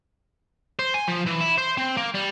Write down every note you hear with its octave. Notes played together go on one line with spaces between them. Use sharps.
C5
G#5
F3
E3
E4
C5
C4
A#3
G3